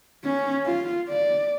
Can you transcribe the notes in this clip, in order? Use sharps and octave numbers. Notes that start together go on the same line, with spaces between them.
C#4
F4
D5